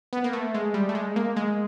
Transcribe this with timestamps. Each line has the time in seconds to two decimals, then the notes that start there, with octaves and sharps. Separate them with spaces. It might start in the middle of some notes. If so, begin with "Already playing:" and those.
0.13 B3
0.24 A#3
0.33 A3
0.54 G#3
0.74 G3
0.89 A3
0.95 G#3
1.16 A#3
1.36 G#3